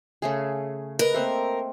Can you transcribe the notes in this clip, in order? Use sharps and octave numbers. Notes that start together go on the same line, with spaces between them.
C#3 A3 G#4
A#4 B4 D#5
A3 A#3 C4